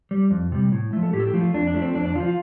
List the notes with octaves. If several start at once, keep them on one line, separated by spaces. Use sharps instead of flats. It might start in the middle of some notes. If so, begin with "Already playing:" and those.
G3
F2
C3 G3
A2
F3 A3
A4
A2 G4
A4
G4
F3 A3
F4
F2 D4
D4
F3 A3
C4
F2 C4 D4
D4
D3 F4
F3
F4